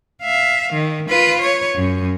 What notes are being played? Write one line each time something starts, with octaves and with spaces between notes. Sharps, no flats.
E5 F5
D#3
F4 B4
C#5
F#2